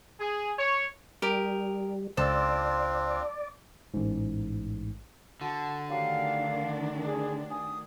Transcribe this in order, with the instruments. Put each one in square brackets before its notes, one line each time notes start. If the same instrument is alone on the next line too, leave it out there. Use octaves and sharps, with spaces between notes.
[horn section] G#4
C#5
[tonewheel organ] G3 [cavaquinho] G4 A#4 D#5
[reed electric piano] C#2 C5 [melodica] C4 D4 F4 [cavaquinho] A4 [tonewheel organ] D5
[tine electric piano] A1 G#2
[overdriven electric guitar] D3 [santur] F#4 [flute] A5
[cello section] D#3 A3 D4 [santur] F#3 G4 [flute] F5
[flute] G#4
[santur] G#5 [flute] D#6